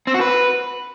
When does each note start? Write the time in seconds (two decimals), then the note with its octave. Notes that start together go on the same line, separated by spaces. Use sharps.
0.07 C4
0.14 F#4
0.21 B4